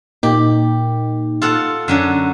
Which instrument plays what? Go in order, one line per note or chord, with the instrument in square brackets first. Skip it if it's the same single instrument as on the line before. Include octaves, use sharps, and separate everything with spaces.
[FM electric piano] A#2 A#3 D#4 [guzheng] G4
[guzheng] F4 A4 F#5
F#2 D3 F#3